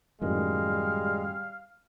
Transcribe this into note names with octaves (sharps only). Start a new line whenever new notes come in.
F#2 A2 D#3 G3 G#3 F5